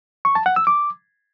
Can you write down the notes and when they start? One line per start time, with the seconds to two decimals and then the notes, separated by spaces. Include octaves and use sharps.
0.25 C#6
0.35 A5
0.46 F#5
0.56 E6
0.67 D6